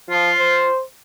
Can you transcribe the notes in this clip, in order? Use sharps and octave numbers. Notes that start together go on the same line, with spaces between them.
F3 F4
C5